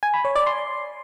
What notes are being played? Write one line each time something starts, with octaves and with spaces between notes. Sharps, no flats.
G#5
B5
C#5
D5
C6